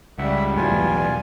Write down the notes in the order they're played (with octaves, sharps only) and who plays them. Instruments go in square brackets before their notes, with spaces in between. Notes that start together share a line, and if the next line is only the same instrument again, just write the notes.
[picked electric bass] C#2 [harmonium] G3 [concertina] E5 F#5
[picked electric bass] A2 F3 F#3 [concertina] F4 G#5
[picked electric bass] B1 E2 B3